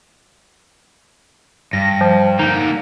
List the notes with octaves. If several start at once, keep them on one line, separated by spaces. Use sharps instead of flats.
G2 A#6
F3
D3 A#3 D#4